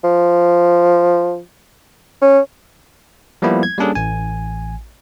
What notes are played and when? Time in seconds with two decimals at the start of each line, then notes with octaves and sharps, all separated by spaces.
0.04 F3
2.22 C#4
3.42 F3 G3 A#3 B3 E4
3.63 G#6
3.78 G3 A#3 C#4 D4 G#4 A4
3.95 A1 G#5